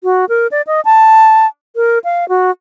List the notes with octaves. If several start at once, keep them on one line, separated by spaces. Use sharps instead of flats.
F#4
A#4
D5
D#5
A5
A#4
F5
F#4